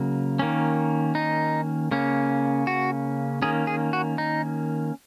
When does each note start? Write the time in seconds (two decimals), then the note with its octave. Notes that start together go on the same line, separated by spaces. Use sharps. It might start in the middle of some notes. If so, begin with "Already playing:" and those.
Already playing: C#3 F#3 A#3
0.39 D#3 A#3 C#4
1.15 D#4
1.91 C#3 A#3 C#4
2.67 F#4
3.42 D#3 A#3 C#4 G#4
3.67 G#4
3.93 F#4
4.18 D#4